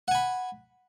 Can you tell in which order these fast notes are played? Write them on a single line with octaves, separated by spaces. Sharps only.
F#5 G#5 B5